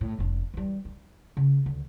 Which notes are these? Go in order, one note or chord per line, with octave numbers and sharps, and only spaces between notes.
A2
F1 D4
E3 G3
D#4
C#3
D2